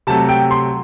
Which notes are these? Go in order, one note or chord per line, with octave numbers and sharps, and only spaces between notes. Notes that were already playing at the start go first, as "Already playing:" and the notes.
C3 F#3 A3 A5
G5
C6